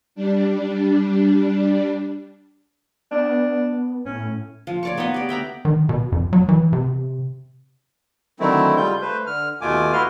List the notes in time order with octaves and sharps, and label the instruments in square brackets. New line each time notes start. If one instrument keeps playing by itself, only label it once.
[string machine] G3 D4
[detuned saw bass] B3 [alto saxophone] D4
[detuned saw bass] A2 [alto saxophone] C#4
[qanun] F3
C#5 D5 C#6
B3 D#4 B4 D#5
G4 D5
E5 G5 A#5 B5
[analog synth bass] D#3
B2
F2
F#3
E3
C3
[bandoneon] D3 D#3 F#3 A3 C4 E4
C#3 G3 F4 G6
A3 B4 C5
D3 F6
D#2 B2 A3 F4 G#5 D6
E4 F#4 B4 C6 F6